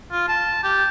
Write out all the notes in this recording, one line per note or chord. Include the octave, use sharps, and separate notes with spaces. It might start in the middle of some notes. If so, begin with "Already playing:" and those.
F4
A5
G4